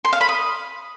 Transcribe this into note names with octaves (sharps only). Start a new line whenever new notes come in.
C6
F5
B5
D#6